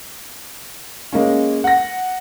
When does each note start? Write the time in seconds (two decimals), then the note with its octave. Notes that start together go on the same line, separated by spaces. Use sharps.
1.13 G#3 A#3 C#4
1.64 F#5 A#6